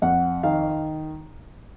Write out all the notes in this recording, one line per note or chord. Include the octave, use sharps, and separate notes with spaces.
F2 F#5
D#3 F5